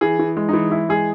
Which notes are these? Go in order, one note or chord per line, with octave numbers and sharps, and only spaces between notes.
E3 G#4
E3
G#3
E3 D#4
E3 E4
G#3 G#4